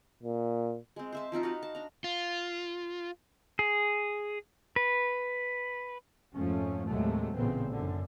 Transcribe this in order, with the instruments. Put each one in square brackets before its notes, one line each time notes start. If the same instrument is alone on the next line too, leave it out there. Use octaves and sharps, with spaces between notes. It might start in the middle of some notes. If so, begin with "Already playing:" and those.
[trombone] A#2
[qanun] G#3 C4
C5 E5 A5
F3 C4 D#4 F4
F#4 B4 F5
A5
D4 A#5
[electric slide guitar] F4
[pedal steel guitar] G#4
B4
[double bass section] F2 G#2 F3 A3 C#4
D#2 A2 C3 F#3 G#3 A3
A1 A#2 C#3 A3 B3 C4
F#2 D3